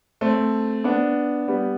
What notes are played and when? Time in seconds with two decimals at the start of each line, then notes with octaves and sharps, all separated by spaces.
0.21 A3 C4
0.84 B3 D4
1.48 G3 B3